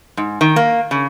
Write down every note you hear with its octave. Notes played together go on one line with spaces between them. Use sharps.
G#2
D#3
A#3
C#3